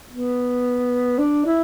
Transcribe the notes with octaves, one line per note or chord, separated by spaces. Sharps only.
B3
D4
E4